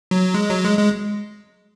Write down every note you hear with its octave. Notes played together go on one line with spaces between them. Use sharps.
F#3
G#3
F#3
G#3
G#3